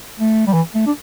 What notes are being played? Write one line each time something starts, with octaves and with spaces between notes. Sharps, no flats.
A3
G3
E3
A3
D4